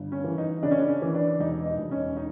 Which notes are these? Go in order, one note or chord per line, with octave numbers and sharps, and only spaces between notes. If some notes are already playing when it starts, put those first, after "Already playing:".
Already playing: G1
C#4
E3
D#4
C#3 D4
C#4
D4
C#4
E3
D4
E1 D#4
D#4
E1
C#4
D#4